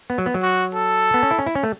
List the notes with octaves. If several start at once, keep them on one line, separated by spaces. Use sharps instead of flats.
B3
F#3
B3
F#3
F#4
A4
B3
C#4
E4
C#4
E4
C#4
A3